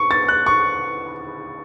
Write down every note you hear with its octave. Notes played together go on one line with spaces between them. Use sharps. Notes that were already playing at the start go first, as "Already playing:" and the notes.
Already playing: C#6
A6
F#6
C#6